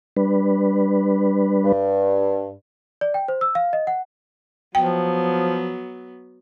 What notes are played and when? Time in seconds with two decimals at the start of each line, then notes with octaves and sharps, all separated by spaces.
0.17 G3 D4 B4
1.64 G2
3.01 D5
3.14 G5
3.28 C5
3.41 E6
3.55 F5
3.73 D#5
3.87 F#5
4.75 F3 F#3 B3 G5